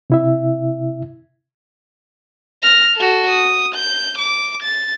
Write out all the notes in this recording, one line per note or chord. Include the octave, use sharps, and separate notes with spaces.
C3 E4 E5
F6 A#6
F#4 A4
D#6
G6
D6
A6